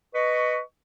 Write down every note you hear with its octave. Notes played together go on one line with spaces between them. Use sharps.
B4 D#5 C#6